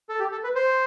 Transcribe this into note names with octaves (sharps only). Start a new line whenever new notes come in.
A4
G4
A4
B4
C5